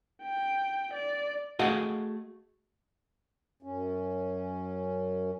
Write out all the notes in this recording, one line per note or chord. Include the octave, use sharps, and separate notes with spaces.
G5
D5
A3 F#4 G#4 D#5 F5 F#5
F#2 C#4